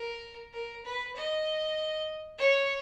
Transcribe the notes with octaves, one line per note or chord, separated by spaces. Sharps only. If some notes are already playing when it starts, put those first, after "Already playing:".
Already playing: A#4
A#4
B4
D#5
C#5